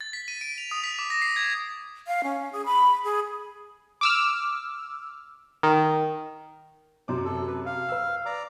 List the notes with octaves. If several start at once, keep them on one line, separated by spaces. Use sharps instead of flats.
A6
B6
D#7
D7
F7
D#6
B6
D6
A#6
C7
G#6
F5
C#4
G#4
B5
G#4
D6 E6 F6
D#3
F#2 C3 C5 D6
A4
B4
F5
B4 E6
D5 A#5 D6